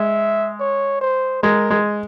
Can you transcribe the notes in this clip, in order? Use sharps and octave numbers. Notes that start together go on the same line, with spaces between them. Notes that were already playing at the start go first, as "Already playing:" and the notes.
Already playing: G#3 E5
C#5
C5
G#3 A#4
G#3